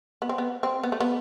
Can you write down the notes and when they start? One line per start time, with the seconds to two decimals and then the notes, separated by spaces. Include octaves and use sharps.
0.22 B3
0.29 C4
0.38 B3
0.63 C4
0.83 B3
0.92 A3
1.00 B3